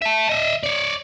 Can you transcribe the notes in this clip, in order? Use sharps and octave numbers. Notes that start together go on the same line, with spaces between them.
E5 A5
D#5 E5
C#5 D5